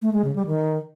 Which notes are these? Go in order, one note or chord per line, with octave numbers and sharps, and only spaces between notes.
A3
G#3
C#3
G3
D#3